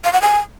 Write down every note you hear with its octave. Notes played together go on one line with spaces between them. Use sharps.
F5
F#5
G#5